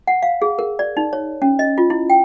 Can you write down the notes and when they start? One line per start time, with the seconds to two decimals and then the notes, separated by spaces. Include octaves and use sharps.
0.07 F#5
0.23 F5
0.42 G#4
0.59 A#4
0.79 D5
0.97 D#4
1.13 C#5
1.42 C#4
1.59 D#5
1.78 F4
1.90 E4
2.10 G5